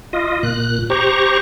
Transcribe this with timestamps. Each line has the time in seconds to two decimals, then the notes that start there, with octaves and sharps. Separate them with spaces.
0.13 F4 D#5
0.43 A#2 F#6
0.90 G4 C5 A#5 C#6